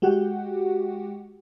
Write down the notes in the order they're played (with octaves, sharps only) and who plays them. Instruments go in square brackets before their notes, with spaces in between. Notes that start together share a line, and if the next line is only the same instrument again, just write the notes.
[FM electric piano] G#3 F#4 G4 F#5 G5